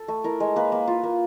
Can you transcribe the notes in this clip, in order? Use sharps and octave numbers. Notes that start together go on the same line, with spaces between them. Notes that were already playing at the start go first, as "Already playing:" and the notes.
Already playing: A4
A3
E4 A#4
G#3
A#3 B4
A#3
F4
A#3